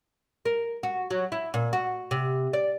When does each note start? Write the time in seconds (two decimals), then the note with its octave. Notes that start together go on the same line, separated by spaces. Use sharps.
0.45 A#4
0.83 F#4
1.11 F#3
1.32 E4
1.54 A#2
1.73 F#4
2.11 C3
2.53 D5